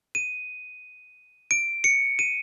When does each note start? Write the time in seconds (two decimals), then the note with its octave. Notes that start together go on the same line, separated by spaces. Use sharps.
0.15 D#7
1.51 D7
1.84 C#7
2.19 D#7